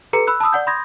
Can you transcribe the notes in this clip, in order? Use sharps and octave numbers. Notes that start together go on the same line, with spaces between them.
G4 A4 B4 A#5 C#7
B5 E6 F#6
A5 B5 D#6 E6
D5 F#5 G6
B5 C6 D#6 G6 G#6 A#6